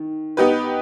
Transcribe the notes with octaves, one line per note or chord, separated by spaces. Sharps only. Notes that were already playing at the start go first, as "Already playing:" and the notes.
Already playing: D#3
B3 D#4 G4 B4